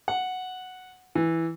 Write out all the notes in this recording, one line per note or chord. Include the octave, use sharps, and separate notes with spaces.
F#5
E3